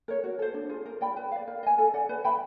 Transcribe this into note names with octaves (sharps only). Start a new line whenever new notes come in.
A#4 C#5
F#4
A4 C5
D4
F4 G#4
A#4
D5 G5 B5
B4
D5 F5
A#4
D#5 G#5
A4
D5 F#5
B4
E5 G5 B5